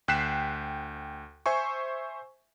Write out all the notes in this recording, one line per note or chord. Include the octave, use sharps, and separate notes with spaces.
D2 G5 F#6 B6 C7 E7
C5 E5 G#5 C#6